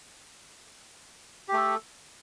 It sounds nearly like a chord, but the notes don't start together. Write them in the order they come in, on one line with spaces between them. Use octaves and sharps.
G4 A3 A4